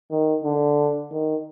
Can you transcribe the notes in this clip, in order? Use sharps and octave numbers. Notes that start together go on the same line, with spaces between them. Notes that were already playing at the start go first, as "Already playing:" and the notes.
D#3
D3
D#3